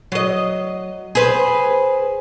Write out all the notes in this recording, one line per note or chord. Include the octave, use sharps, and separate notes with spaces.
F#3 D#5
G#4 B4 C5